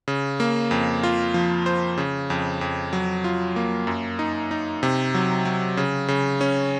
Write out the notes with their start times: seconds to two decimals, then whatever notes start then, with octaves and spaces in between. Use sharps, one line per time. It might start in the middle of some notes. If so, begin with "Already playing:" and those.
0.08 C#3
0.40 A#3
0.71 F2
1.03 F4
1.34 F3
1.66 C5
1.97 C#3
2.30 F2
2.61 F2
2.93 F#3
3.24 F4
3.56 A#3
3.87 F#2
4.19 D#4
4.51 D#4
4.83 C3
5.14 F#3
5.45 F#3
5.77 C#3
6.08 C#3
6.41 C#4